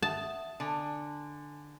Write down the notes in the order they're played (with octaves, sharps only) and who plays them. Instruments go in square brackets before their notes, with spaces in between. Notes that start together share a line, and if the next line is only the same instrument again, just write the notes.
[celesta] E5 F#5 D#6 [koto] A5
[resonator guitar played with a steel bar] D3 [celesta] G#5